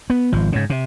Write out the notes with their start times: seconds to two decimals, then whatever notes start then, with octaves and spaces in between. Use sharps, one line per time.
0.10 B3
0.32 G#1 F3
0.52 G#2 C#3
0.70 C3